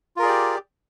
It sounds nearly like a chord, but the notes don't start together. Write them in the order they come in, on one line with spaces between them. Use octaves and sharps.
F4 A#4 G#4 D5 G4